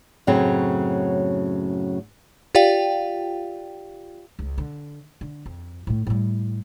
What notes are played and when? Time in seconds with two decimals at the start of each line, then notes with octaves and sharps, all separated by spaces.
0.27 F#2 A2 C#3 F#3 C4
2.55 F4 G4 D5 F5 G5
4.39 C#2
4.58 D3
5.21 D3
5.46 F2
5.87 A2 A3
6.07 A2 G3